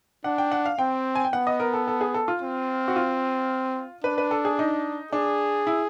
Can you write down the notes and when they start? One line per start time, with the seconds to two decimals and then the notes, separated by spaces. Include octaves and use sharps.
0.24 D4 F#5
0.38 G5
0.52 F#5
0.66 F5
0.79 C4 G5
1.15 G#5
1.25 G5
1.33 B3 F#5
1.47 D#5
1.60 A#4
1.74 A4
1.87 A4
2.01 G#4
2.14 A4
2.28 F4
2.42 C4
2.88 F#4
2.96 F4
4.04 D4 B4
4.18 B4
4.31 A4
4.45 G#4
4.59 D#4
5.12 D4 G#4
5.67 E4